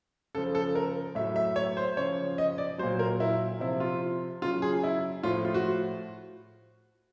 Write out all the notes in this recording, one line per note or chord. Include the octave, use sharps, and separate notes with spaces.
C#3 F3 A4
A4
A#4
A2 F#3 E5
E5
C#5
C5
C#3 F3 C#5
D#5
D5
A#2 F#3 C5
A#4
E4
C3 F3 E4
F4
C#3 F#3 F4
G#4
E4
A2 F3 F4
F4
F#4